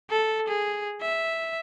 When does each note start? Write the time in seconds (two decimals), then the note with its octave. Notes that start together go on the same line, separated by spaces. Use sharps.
0.10 A4
0.48 G#4
1.02 E5